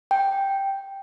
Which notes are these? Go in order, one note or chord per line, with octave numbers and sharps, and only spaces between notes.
G5